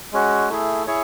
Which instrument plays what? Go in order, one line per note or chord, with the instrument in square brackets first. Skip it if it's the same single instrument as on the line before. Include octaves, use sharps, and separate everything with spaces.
[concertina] G#3 C#4 F#4
A3 E4 G#4
E4 G#4 C#5